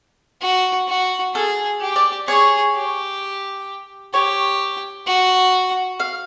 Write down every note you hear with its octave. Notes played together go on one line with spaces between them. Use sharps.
F#4
F#4
G#4 A4
G4
D5
G#4 C#5
G4
G4 C#5
F#4
F5